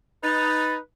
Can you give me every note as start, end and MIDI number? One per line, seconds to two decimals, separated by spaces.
0.24 0.76 63
0.24 0.80 71
0.24 0.74 93